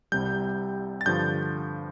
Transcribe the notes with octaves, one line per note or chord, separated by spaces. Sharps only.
C2 C3 G3 G6
A6
G2 D3 F3 D4 G6